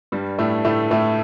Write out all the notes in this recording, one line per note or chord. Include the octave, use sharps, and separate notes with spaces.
G2 G3
A2 A3
A2 A3
A2 A3